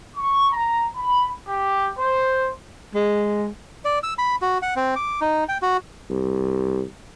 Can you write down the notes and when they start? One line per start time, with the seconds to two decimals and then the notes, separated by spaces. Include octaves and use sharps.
0.16 C#6
0.52 A#5
0.96 B5
1.48 G4
1.99 C5
2.95 G#3
3.85 D5
4.03 E6
4.18 B5
4.42 F#4
4.62 F#5
4.76 C4
4.96 D6
5.21 D#4
5.49 G5
5.62 F#4
6.10 C2